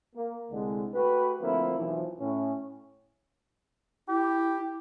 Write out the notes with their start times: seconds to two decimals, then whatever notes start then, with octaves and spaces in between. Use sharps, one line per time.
0.15 A#3
0.51 C2 D3 G#3
0.94 A3 F#4 G4 B4
1.41 D3 F3 A3 A#3 C4 E4
1.77 B1 E3 F3
2.19 A2 C#4
4.09 E4 G4